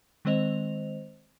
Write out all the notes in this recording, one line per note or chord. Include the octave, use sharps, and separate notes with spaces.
D#3 G#3 C4 C5 D#5 F7